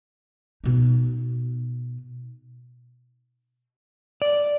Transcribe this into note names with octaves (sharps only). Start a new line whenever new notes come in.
B2 D#4
D5